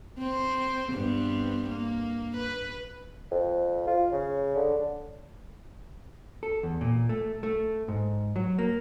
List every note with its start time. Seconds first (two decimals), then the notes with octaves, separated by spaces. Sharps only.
0.18 C4 C5
0.92 G2 B3 C4
1.70 A#3
2.37 B4
3.31 F2
3.87 F4
4.12 C#3
4.56 D3
6.43 A4
6.63 E2
6.81 A#2
7.09 A3
7.43 A3
7.88 G#2
8.36 F#3
8.58 A#3